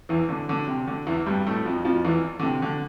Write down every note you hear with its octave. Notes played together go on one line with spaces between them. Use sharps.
E2 E3
D3
D3
C3
D3
E2 E3
G2 G3
A2 A3
F2 F3
F2 F3
E2 E3
D3
C3
D3